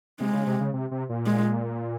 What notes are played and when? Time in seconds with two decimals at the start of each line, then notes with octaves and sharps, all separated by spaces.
0.20 C3 G#3
0.34 C#3
0.46 C3
0.61 C#3
0.73 C3
0.91 C3
1.09 A#2
1.27 G#3